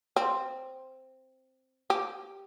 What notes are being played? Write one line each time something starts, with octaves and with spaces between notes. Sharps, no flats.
C4
G4